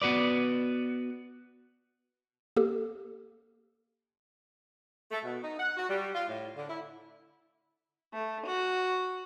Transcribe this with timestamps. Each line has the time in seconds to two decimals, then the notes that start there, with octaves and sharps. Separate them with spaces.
0.02 B3 F#4 B4 D5
2.57 A#3 G4 A4
5.10 A3
5.24 B2
5.42 D#4
5.59 F#5
5.76 F#4
5.90 G3
6.15 F4
6.28 A2
6.56 D3
6.69 E4
8.14 A3
8.45 F#4